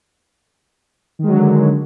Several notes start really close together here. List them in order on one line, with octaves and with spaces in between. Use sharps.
D#3 G#3 F#3 D3